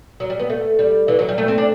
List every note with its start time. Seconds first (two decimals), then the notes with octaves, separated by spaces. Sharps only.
0.20 F#3
0.30 G3
0.39 B3
0.50 A3
0.79 G3
1.08 E3
1.19 F#3
1.29 G3
1.38 A3
1.48 C4
1.58 D4